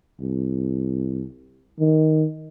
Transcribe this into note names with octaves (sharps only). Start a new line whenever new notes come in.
C2
D#3